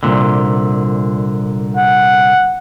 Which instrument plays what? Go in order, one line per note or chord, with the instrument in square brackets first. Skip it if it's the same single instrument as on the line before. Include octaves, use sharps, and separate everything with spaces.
[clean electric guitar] C2 A#2 D3
[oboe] F#5